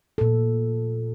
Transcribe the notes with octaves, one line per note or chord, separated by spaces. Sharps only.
A#2 A4